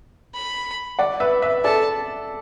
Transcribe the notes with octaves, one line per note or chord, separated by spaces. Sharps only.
B5
D5 F#5
B4 E5
B4 E5
A4 D5 A5